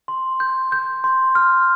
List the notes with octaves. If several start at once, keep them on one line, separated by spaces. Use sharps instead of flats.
C6
G6
G6
C6
F6